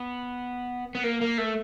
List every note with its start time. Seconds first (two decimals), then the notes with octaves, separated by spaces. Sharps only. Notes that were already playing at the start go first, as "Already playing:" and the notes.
Already playing: B3
0.95 B3
1.04 A#3
1.21 A#3
1.38 A3